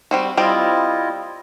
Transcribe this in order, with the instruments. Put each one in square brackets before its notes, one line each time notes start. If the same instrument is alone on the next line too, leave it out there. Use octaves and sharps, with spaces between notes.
[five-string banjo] G3 C4 F#4
[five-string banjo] G3 C4 D5 [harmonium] E4 F4 D#5